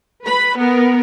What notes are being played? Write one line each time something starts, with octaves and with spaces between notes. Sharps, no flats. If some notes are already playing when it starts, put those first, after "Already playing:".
B4 B5
B3 A#4